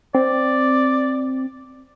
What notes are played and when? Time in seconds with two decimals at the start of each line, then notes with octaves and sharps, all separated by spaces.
0.15 C4 D5